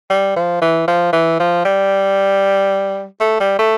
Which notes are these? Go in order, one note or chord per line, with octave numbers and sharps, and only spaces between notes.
G3
F3
E3
F3
E3
F3
G3
A3
G3
A3